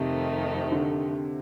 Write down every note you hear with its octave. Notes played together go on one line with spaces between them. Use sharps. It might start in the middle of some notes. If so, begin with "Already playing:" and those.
Already playing: F2 C3 D#3 A3 D#4
D3